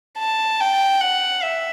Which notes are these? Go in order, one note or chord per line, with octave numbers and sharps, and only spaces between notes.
A5
G5
F#5
E5